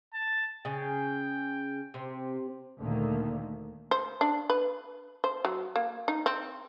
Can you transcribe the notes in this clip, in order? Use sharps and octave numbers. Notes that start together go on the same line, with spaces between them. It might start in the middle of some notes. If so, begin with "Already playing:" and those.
A5
C#3 G5
C3
D2 A#2 D3 D#3 A3 A#3
C5
D4
B4
C5
F#3
A#3
D#4
C4